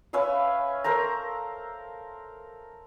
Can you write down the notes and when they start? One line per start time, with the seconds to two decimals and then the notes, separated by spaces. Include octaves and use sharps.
0.13 C#4 B4 E5 F5
0.84 A4 A#4 C5 A#5